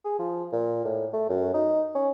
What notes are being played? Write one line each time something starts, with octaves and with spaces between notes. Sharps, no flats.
G#4
F3
A#2
A2
A3
F#2
D#4
C#4